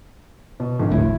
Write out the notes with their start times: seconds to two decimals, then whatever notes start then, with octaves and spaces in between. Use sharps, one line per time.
0.60 B2
0.79 G#1 D3 F3
0.91 F#1 D2 A2 E4